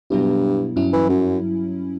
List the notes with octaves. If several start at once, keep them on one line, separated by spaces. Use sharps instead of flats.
G2 B2 F#3 B3 E4
G2 F#3 C#4 E4
E3
F#2